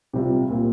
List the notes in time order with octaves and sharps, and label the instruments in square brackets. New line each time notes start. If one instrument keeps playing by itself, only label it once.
[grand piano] C3 G3 C4 F4
A#2